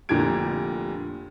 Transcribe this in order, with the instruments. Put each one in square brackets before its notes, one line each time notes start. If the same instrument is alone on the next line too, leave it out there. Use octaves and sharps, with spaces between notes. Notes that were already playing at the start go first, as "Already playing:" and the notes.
[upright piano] F1 A#2 D3 G4 G#6 D7